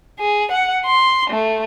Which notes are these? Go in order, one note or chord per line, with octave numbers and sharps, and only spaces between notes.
G#4
F#5
C6
A3